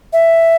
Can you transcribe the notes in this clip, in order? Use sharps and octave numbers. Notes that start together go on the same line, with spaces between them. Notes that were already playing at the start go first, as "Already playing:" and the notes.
E5